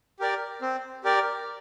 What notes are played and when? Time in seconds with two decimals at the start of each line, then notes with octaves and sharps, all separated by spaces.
0.19 G4 A#4 D5
0.61 C4
1.04 G4 A#4 D5